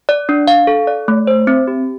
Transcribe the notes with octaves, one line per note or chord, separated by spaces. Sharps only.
D5
D4
F5
A4
D5
A3
C5
C4
G4